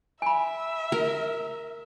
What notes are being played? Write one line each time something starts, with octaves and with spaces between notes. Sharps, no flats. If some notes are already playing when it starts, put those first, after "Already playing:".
E5 G#5 B5
A#4